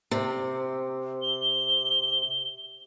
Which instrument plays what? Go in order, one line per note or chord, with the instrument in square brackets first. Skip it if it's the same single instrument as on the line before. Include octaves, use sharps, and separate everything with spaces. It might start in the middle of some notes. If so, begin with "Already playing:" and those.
[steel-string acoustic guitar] C3
[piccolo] G7